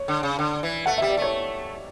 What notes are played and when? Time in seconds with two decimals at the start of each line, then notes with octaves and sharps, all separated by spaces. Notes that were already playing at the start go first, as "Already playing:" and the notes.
Already playing: C#5
0.08 D3
0.23 C#3
0.39 D3
0.63 E3
0.86 A3 F#5
0.98 E5
1.02 G3
1.10 D5
1.17 A3 C#5